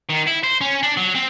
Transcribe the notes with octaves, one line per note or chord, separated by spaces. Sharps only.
D#3
E4
C5
C#4
D4
F#3
C4